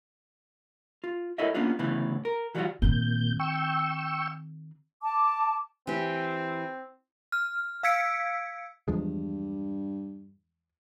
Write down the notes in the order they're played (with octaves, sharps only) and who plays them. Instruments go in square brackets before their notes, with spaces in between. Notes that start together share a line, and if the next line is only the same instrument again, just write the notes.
[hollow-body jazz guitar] F4
E4 A4 A#4 C#5 D#5 E5
A#3 B3 C#4 D4 F4
D2 A2 C#3 E3 B3
A#4
E3 F#3 G3 D#4 F4 F#4
[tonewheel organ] A#2 G6 [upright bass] D#3 C4
[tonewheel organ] G5 C#6 E6
[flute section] A5 D6
[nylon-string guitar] E3 G4 [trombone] C4
[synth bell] F6
F5 E6 G#6 B6 C#7 D7
[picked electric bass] E2 F3 G#3 [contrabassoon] G2